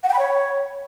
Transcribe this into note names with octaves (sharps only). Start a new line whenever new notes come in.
F#5
G5
B5
C#5